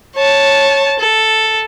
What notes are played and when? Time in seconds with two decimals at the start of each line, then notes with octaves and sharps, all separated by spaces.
0.16 C#5 A5
0.99 A4